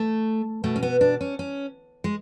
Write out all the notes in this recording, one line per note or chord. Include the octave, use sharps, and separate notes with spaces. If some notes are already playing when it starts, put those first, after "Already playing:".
Already playing: A3
B2 A3
C#4
B3
D4
C#4
C#4
G#3